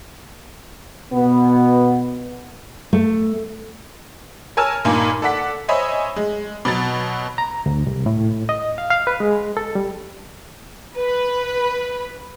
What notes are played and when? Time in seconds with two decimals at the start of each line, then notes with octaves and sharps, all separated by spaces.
1.12 B2 B3
2.93 A3
4.57 A#4 C#5 G#5 A5 E6 F6
4.85 G2 A#2 D#3 A#3 G#5
5.22 A4 D5 F#5 B6
5.68 C5 C#5 D#5 E5 G#5 B5
6.16 G#3
6.65 B2 F#3 A6
7.38 A#5
7.66 D2
7.87 C2
8.06 A2
8.49 D#5
8.78 F5
8.90 F5
9.07 B4
9.20 G#3
9.57 A4
9.75 G3
10.96 B4